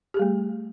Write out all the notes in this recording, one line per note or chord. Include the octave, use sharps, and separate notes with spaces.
G3 A3 G4 G#4